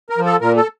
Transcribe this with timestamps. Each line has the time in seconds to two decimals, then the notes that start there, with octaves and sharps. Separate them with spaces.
0.10 A#4
0.18 F3
0.25 A4
0.41 A#2 A#4
0.56 A4